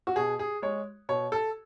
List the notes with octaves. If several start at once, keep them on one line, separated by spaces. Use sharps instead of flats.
F#4
B2 G#4
G#4
G#3 C#5
B2 C#5
A4